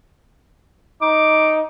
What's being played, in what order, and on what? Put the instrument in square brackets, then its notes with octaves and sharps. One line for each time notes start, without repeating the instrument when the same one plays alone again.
[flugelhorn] D#4 [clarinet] D6